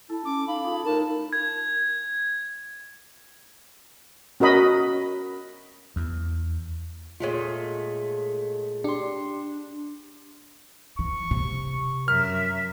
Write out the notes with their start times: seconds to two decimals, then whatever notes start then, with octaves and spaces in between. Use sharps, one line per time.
0.09 E4 A4
0.25 C#4 D6
0.48 D#4 F5 B5
0.64 F4 G#4 A4
0.85 A2 D#4 A#4 C#5 A5 A#5
1.33 G#6
4.40 C#4 F#4 A#4 D#5 B5
5.96 E2
7.20 A#2 G#3 A3 F4 C#5
8.84 D4 G4 C6
10.99 E3 C#6
11.31 C3
12.08 F#2 A#4 E5 F6